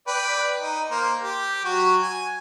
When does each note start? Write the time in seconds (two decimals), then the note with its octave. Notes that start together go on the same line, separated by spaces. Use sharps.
0.07 B4 D5 G5
0.60 D#4
0.91 A#3 C5
1.22 G4
1.65 F#3 F#4
2.02 G#5